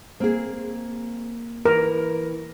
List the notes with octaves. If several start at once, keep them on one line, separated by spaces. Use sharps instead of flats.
A#3 C4 G#4
E3 A#4